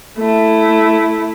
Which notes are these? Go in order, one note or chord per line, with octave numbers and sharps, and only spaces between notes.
A3 E4